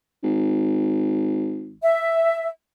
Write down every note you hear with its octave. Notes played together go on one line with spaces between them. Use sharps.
G#1
E5